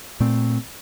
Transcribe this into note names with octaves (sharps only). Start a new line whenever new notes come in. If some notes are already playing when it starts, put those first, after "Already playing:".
A#2 A3 C4